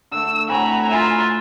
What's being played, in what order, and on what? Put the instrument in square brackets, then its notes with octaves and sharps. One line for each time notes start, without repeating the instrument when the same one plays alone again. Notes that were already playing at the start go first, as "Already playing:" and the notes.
[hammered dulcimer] D3 A3 [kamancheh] E6
[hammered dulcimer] A2 C4 F#4 [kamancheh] G#5 A#5 [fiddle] B5
[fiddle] F4 E5 [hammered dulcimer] B5